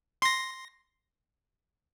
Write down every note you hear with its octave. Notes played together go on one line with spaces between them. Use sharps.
C6 A#6